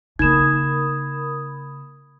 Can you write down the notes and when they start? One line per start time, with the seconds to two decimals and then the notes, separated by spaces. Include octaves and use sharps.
0.19 C#3 A#3 D#4 A#4 B5 D#6 G#6 E7